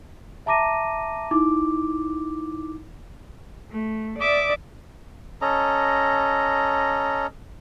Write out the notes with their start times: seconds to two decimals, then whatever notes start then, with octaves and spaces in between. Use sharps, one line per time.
0.46 E5 A5 A#5 D6 A#6 D#7
1.31 D#4 E4 D6
3.71 A3
4.19 D5 E5 D6 D#6
5.42 C#4 A4 D#5 A#5